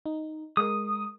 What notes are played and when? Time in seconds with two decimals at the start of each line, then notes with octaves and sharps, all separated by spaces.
0.06 D#4
0.57 G#3 A#4 D#6